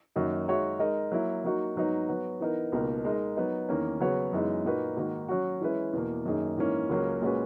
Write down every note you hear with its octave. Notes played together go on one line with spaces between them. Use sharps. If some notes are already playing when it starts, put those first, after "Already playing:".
F#2 D#3 A#3 D#4 F#4
G#3 D#4 F#4 C#5 E5
G#3 D#4 A#4 D#5
F#3 A#3 E4
F#3 A#3 D#4 F#4
G#2 F#3 B3 D#4
F#3 B3 F#4
E3 B3 D#4 A#4
C#2 B2 A#3 D#4 A#4
G#3 D#4 A#4 D#5
F#3 B3 D#4
E2 D#3 A#3 C#4
C#3 F#3 B3 F#4 C#5
F#2 E3 G#3 B3 D#4
A#2 A#3 D#4 F#4 B4
G#2 D#3 A#3 D#4 F#4
F#3 C#4 F#4
E3 G#3 C#4 E4 B4
E2 B2 A#3
F#2 D#3 A#3 D#4 G#4
G#2 E3 A#3 C#4
C#2 C#3 F#3 A#3 C#4
A#2 G#3 C#4 F#4 B4